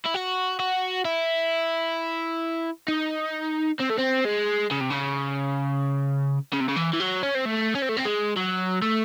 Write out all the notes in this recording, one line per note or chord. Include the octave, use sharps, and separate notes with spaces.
E4
F#4
F#4
E4
D#4
C4
A3
C4
G#3
C#3
C3
C#3
C#3
C3
C#3
E3
E3
F#3
C#4
C4
A3
C#4
C4
A3
C4
G#3
F#3
A3